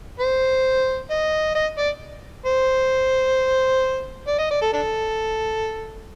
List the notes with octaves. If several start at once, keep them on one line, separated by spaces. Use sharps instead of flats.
C5
D#5
D#5
D5
C5
D5
D#5
D5
A4
D4 A4